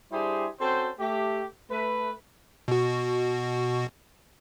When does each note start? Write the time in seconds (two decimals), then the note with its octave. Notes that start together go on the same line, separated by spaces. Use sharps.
0.12 G3 D4 E4 G4 G#4 C5
0.60 C4 C#4 F#4 A4 C5
0.99 A3 G4
1.71 A3 B4
2.68 B2 F#4